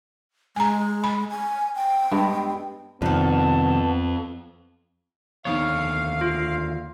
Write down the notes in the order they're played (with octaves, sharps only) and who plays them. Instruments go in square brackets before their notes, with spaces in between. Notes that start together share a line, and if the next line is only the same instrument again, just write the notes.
[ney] G#3 [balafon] G#5 A#5
[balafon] B5
[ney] G#5
G5
[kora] G2 G#3 B3
[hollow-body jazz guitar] C2 D#3 [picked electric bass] F2 [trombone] B3 [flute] A5
[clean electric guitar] D#2 D3 C#5 [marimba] F3 B3 D#4 [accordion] F5
[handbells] F4